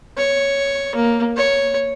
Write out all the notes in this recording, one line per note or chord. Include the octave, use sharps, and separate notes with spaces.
C#5
A#3
C#5